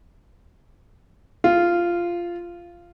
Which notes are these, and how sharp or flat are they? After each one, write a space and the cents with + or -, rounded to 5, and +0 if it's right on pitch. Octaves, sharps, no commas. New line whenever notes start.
F4 -10